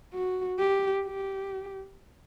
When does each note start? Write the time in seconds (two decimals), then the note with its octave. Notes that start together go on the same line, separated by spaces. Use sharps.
0.14 F#4
0.59 G4
1.06 G4